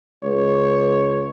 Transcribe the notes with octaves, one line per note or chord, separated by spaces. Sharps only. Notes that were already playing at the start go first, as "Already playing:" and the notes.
C#2 C#5